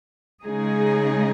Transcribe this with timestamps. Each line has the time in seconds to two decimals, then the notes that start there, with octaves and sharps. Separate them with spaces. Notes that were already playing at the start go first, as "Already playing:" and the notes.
0.45 C#3 G#3 D#4 G#4